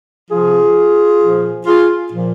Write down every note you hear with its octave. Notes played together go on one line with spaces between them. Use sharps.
C3 F3 F4 G#4
A#2 F3
F4 G#4
A#2 F3